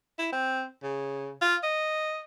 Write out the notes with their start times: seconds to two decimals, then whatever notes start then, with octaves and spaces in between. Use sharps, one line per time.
0.18 E4
0.32 C4
0.83 C#3
1.41 F4
1.63 D#5